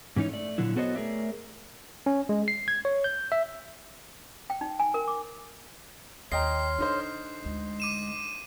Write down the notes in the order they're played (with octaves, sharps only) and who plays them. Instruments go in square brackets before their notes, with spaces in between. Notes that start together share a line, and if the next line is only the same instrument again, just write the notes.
[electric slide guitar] G#2 E3 C#4 D#4 C#5
A3 D5
A#2 D3 F#3 E4
B3 F#4 A4 C5 C#5 D#5
A3 G#4 A#4 C#5 D5 E5
[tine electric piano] C#4
G#3
C7
G#6
C#5
G6
E5
[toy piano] G5
D#4
G#5
A#4
D6
[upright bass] D#2 [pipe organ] C#5 C6 F6 [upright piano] D#5 G5 A#5 [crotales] C7
[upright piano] D3 D#4 C5 [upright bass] D4
[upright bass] D2 F4 [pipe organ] G#3
[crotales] D6 D#7 E7